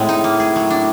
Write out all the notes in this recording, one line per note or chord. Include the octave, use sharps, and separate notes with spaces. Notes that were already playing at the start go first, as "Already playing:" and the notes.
Already playing: A2 G#3 C4
D#4
A#3
G#4
F#3
D4